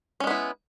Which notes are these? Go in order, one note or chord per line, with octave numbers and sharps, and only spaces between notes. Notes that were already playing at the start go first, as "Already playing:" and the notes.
G#3 B3 C#4 E4